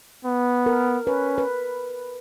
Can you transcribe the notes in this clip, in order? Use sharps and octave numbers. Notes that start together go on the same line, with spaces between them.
B3
A#4
C#4 B4
B4